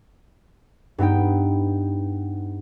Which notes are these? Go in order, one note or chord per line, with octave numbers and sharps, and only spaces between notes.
G2 B3 D#4 G5